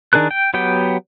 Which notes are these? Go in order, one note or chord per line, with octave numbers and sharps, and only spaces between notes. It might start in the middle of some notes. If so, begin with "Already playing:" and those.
D#3 D4 G#4 A#4 F#6
G5
F#3 B3 G4 G5